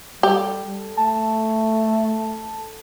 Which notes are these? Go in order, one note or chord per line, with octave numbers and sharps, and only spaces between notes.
G3 G4 A4
A3 A5